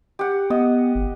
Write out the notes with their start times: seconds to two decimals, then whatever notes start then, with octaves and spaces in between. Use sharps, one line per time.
0.19 G4 F#5
0.50 B3 D#5
0.95 G1